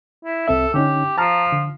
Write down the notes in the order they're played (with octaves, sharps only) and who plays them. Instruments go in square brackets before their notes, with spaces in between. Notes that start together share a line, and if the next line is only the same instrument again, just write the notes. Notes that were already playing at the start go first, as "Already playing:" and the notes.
[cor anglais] E4
[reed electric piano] C2 C4 E5 [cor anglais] A4
[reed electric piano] D3 C#4 D#4 [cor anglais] G4
[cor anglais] F3 [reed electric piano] A5 A#5 F6
[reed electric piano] D3